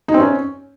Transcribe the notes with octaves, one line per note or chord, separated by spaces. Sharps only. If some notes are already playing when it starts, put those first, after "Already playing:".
D#4
C4
C#4